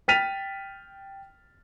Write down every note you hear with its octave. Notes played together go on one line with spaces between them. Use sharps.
G5 F6 A6 B6 D#7 F7